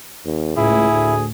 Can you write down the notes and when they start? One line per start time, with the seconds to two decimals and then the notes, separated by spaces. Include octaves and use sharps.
0.25 D#2
0.57 C#2 A2 E4 G#4
0.92 D2